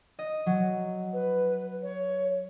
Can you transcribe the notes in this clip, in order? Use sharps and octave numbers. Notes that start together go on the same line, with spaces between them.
D#5
F#3
B4
C#5